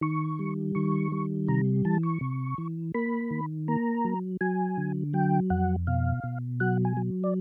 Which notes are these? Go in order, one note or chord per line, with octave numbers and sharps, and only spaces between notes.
D#3 C#6
G3
D#3 C#6
G3
C3 A#5
E3 A5
C#6
C3
E3
A#3 B5
D#3
A#3 A#5
F#3
F#3 G#5
D3
F#3 G5
F2 F#5
B2 F5
B2
F#3 F#5
G#5
F#3
D5